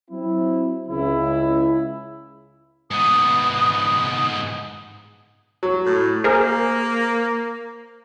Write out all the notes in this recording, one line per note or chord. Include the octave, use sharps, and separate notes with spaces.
F#3 C4 E4
C#2 C#3 E4
G#2 B3 D#6
F#3
A2
A#3 G#4 A#4 C5